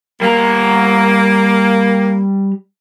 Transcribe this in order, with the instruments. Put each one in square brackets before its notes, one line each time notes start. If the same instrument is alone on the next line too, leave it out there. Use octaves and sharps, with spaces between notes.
[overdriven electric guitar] G3 A#5 [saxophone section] A#3